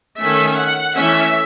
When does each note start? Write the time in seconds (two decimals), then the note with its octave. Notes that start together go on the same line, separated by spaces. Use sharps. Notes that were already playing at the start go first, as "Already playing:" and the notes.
0.19 D#3 A3 C#4 E5
0.57 F#5
0.95 E3 A3 C#4 E5